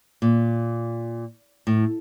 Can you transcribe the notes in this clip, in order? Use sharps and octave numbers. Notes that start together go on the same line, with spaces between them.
A#2
A2